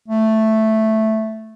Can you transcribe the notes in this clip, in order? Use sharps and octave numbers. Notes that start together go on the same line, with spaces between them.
A3